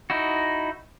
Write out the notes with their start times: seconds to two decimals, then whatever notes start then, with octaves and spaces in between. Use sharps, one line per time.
0.10 D#4 E4 F#4